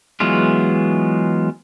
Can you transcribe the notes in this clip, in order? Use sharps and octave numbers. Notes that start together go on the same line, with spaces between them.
E3 F#3 G#3 B3 F4